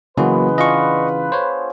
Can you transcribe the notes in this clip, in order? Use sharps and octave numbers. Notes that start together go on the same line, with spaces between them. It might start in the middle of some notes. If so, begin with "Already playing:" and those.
C#3 E3 F#3 G#3 A#3 B3 F#4 B4
D4 F4 G#4 D#5 C#6
C5 C#5